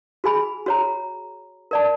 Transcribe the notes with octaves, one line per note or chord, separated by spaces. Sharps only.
F#4 G#4 G#5 B5
F#4 C#5 A#5
A#4 D5 A5